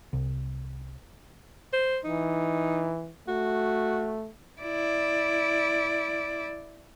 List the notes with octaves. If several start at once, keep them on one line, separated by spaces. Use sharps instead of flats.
C2
C5
E3 D#4
A3 F#4
E4 D5